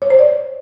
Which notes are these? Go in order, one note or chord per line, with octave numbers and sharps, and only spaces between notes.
C#5
C5
D5